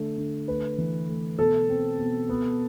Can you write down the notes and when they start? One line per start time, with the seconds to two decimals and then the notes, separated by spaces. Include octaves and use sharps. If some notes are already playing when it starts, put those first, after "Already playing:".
Already playing: D3 A3
0.18 D3
0.48 A3 B4
0.78 E3
1.08 A3
1.39 B2 A4
1.69 C4
1.99 B2
2.29 B3